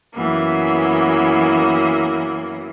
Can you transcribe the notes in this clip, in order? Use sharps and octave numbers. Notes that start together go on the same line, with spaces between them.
F#2 E3 F#3 A#3 B3